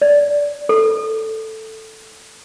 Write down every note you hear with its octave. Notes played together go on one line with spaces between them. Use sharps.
D5
A4